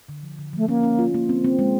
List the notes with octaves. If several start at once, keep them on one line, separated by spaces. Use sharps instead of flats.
D3
F3
D3
F3 A3
A#3 C#4
C#4
F4
A#3
C4
C4
G#3